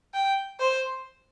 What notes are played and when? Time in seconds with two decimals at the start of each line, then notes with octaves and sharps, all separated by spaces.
0.14 G5
0.60 C5